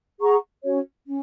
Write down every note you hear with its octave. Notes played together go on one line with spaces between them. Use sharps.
G#4 F#5 A#5 C#6
C#4 F#4 C#5
C#4